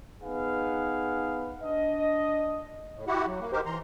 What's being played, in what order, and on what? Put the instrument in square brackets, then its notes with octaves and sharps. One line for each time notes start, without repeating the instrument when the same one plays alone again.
[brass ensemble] B3 D#4 G#4 B4 F5 F#5
D4 D#5
[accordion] A2
E4 F#4 G4 F#5
F#3
A#3
D#4 G4 A#4 C5
E3 A#5 C6